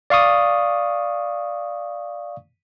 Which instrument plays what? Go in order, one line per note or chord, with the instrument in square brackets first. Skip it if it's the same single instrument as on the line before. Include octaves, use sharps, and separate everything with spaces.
[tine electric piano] D5 F5 C#6 D#6